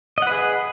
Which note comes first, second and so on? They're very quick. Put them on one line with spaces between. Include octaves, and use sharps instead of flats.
D#5 F#5 B4 G#4